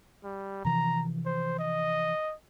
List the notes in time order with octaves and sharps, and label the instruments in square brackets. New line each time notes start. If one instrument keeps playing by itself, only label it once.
[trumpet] G3
[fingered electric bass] C3 E3 F3 [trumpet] A#5
[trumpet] C5
D#5